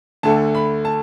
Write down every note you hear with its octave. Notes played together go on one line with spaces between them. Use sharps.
D2 D3 A3 A5
B5
A5